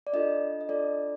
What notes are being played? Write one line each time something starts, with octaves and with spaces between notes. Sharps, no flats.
D5
D4 F4 A4 D#5
D#5
D4 F4 A4 D5